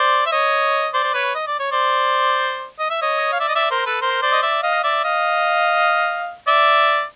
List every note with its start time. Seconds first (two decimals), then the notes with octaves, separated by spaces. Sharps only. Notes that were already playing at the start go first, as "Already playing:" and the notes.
Already playing: C5 D5
0.26 E5
0.32 C#5 D#5
0.94 C5 D5
1.04 C5
1.14 B4 C#5
1.35 D#5
1.47 D5
1.59 C#5
1.72 C5 D5
2.79 D#5
2.90 E5
3.02 C#5 D#5
3.32 F5
3.40 D5 E5
3.48 D#5
3.55 D5 E5
3.71 A#4 C5
3.86 A4 B4
4.01 A#4 C5
4.22 C5 D5
4.33 D#5
4.43 D5 E5
4.63 D#5 F5
4.84 D5 E5
5.04 D#5 F5
6.47 D5 E5